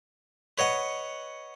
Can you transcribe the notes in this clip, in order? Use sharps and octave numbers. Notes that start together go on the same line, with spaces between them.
B4 C#5 D#5 F#5